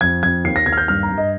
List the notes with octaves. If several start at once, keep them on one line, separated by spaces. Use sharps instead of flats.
F2 G#6
F2 G#6
D#2 C7
A#6
D#2 G#6
F6
G6
G2 F6
A#5
G2
D#5